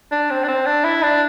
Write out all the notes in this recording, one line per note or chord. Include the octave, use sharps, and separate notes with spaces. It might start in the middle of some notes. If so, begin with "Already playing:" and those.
D4
C4
D4
C4
D4
E4
D4